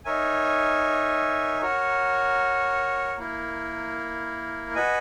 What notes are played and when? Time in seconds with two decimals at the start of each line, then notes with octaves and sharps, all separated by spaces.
0.05 D#4 A#4 C#5 E5 G#5
1.62 F#4 A#4 C#5
3.18 A#3 E4 A#4
4.75 F#4 B4 D#5 G#5